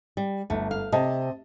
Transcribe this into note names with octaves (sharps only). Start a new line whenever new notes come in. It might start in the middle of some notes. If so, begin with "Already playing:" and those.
G3
G1 A3
F5
C3 D#5 A5